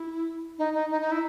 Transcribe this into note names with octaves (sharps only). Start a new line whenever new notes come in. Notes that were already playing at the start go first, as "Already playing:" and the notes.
Already playing: E4
D#4
D#4
D#4
D#4
E4